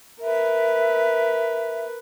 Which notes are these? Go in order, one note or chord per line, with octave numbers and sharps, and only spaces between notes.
A#4 B4 E5